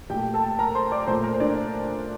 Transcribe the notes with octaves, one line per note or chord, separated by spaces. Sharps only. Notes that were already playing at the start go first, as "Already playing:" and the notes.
A#2 A3 G4 G5
A4 A5
A#4 A#5
C5 C6
D5 D6
A#2 A3 C5 C6
A#4 A#5
C5
D4 D5